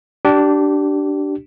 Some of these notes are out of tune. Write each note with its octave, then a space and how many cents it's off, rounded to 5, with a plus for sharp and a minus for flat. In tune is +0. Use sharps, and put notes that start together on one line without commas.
D4 +0 G4 -25